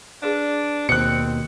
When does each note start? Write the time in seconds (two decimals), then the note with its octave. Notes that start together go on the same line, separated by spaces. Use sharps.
0.22 D4 G#4 B4 F5
0.89 D#2 B2 C4 F#6 C#7